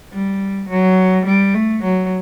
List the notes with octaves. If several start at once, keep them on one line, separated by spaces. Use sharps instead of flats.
G3
F#3
G3
A3
F#3